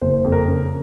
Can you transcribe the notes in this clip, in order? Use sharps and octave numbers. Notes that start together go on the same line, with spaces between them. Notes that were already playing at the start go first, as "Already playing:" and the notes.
F#1 C5
F2
A#4
C#3